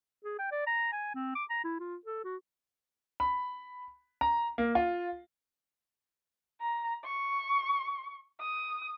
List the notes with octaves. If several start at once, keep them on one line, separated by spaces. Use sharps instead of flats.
G#4
G5
D5
A#5
G#5
C4
D6
A#5
E4
F4
A4
F#4
B5
A#5
A#3
F4
A#5
C#6
D#6